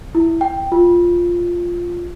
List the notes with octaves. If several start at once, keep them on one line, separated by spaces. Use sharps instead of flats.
E4
G5
F4